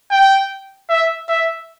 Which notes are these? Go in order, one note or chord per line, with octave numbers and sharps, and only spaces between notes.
G5
E5
E5